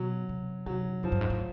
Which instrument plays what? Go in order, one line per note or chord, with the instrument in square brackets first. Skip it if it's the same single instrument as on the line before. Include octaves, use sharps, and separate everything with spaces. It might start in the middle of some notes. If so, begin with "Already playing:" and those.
Already playing: [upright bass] B2 [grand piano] F#3
[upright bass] C3
[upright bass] C3 [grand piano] F#3
[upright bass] F#2 [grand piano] F3
[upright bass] G2
G#2
A2